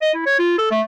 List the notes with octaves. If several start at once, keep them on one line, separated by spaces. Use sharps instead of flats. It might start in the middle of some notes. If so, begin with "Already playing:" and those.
D#5
E4
C#5
F4
A4
A3